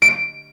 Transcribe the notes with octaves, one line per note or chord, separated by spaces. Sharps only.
D7